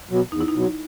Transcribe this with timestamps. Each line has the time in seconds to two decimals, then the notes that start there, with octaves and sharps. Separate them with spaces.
0.11 B2 F#3
0.32 E2 D#4
0.41 E4
0.48 D#4
0.54 B2 F#3